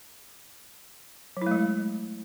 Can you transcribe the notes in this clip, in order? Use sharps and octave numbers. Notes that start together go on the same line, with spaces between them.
F#3 G#3 A3 E4